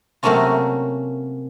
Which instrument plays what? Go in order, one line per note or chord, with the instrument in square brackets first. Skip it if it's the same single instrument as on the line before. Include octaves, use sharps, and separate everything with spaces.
[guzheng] C3 F#3 A3 A#3 C#4 F4